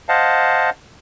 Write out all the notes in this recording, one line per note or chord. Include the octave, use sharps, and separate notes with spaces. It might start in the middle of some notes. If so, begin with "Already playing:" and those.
C5 D#5 F5 F#5 A5